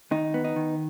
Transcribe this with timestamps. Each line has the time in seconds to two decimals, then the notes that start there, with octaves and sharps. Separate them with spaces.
0.11 D#3 D#4
0.34 B3
0.44 D#4
0.56 D#3